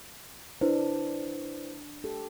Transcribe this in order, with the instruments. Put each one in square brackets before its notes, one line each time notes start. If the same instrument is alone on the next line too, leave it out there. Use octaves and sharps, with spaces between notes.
[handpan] D4 [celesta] E4 B4 C5
[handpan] G4 A4